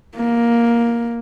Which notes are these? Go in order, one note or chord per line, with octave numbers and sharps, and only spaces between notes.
A#3